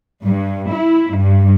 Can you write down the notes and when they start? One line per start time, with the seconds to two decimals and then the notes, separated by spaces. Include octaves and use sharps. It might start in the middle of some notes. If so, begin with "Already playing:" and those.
0.25 G2
0.72 E4
1.15 G2